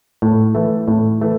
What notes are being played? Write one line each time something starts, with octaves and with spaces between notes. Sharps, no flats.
A2
E3 A3
A2
E3 A3